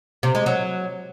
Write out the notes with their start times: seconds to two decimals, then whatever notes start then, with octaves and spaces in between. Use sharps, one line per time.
0.23 C3
0.35 G#3
0.46 F#3